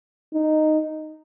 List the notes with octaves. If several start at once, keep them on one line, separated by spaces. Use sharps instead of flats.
D#4